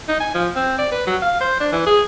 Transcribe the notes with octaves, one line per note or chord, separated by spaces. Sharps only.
D#4
G#5
F3
C4
D5
B4
F#3
F5
C5
D4
E3
G#4